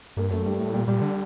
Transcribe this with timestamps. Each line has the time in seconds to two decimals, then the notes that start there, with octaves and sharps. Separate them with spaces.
0.17 G2 A#3
0.31 F#2 A3
0.46 G2 G3
0.59 A2 A3
0.74 A#2 G3
0.87 A#2 G3
1.02 D3